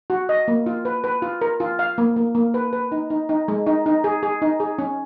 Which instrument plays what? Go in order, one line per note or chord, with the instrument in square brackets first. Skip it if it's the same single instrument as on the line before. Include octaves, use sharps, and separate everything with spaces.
[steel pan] F#4
D#5
A#3
F4
B4
B4
F4
A#4
F4
F5
A#3
A#3
A#3
B4
B4
D#4
D#4
D#4
G#3
D#4
D#4
G#4
G#4
D#4
G#4
C#4